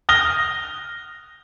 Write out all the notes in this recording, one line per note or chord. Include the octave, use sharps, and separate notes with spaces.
D#6 F6 A#6 G7